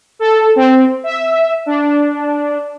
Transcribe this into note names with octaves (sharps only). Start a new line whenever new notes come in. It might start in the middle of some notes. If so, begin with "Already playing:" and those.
A4
C4
E5
D4